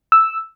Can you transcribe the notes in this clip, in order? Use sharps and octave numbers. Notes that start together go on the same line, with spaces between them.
E6